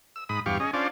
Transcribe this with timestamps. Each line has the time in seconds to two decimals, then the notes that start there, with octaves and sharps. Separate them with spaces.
0.16 E6
0.29 G#2 B5 D#6
0.46 E2 G2 G4 F5 C#6
0.60 C#4 G#4 D#5
0.73 C#4 D4 F4 C5 D5